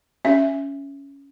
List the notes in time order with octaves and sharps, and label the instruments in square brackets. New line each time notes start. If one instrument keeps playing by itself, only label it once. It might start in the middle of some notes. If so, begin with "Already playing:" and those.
[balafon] C#4 E5